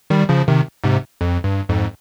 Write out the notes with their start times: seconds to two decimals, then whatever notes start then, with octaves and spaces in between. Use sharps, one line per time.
0.10 D#3 G3
0.29 C#3 F3
0.48 C3 D#3
0.84 G#2 C3
1.21 F2
1.44 G2
1.69 F2 G#2